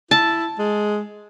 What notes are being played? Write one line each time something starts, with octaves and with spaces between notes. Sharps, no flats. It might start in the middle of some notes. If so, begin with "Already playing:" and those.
E4 A5
G#3